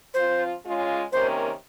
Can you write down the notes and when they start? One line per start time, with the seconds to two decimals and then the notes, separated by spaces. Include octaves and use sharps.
0.14 F3 C4 F4 C5
0.63 C#3 G#3 C#4 F4
1.12 C3 D#3 A#3 C#4 C5